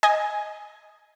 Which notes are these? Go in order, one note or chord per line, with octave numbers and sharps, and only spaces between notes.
D#5 G#5